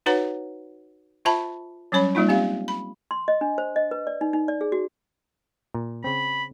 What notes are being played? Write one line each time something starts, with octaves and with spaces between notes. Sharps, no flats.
D#4 F#4 B4 C#5 F#5 A#5
F4 C5 E5 A5 B5
F#3 G3 C#4 C#5 B5
G3 G#3 A#3 D#4 F4
C4 G4 F5
B5
C6
D#5
D4
C5
D#5
B4
D5
D#4
D#4
D5
G#4
F#4
A#2
C#3 C4 B5